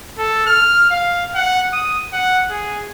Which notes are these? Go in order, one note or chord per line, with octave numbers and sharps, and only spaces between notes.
A4
F6
F5
F#5
D#6
F#5
G#4